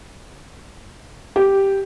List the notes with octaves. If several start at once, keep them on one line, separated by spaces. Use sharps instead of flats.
G4